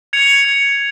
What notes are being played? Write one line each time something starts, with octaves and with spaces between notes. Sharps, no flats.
G#6 C#7 F7
G#6 C#7 F7